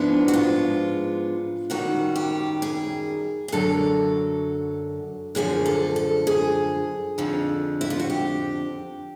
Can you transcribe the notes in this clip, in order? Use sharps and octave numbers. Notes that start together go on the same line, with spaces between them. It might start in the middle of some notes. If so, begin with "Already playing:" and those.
Already playing: G#2 F3 G#3 B3 D4 E4
F#4
F4
F#2 D#3 G3 F#4
G4
G#4
G#4
F#2 D3 F#3 A4
F#2 D3 F3 G#4
A4
A4
G#4
F2 D3 F3
E4
F4
F#4
G4